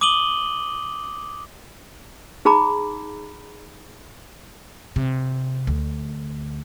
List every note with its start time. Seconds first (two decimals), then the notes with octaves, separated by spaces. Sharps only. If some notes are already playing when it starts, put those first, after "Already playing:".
0.01 D6 D#6 D#7 F#7 G7
2.45 D#4 G#4 A#5 B5 D6
4.96 C3
5.67 D2